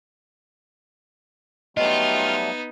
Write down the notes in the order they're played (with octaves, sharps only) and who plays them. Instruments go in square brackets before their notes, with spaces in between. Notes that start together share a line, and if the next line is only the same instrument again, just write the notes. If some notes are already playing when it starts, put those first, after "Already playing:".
[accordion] F#3 G3 A3 [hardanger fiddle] B3 D#4 [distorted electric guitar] F4 [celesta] D#5